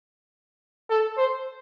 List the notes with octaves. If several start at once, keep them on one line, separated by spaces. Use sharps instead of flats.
A4
C5